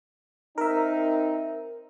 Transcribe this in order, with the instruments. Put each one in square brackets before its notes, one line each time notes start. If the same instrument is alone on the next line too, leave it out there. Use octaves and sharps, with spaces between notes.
[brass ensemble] C4 D#4 [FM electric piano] A#4 E5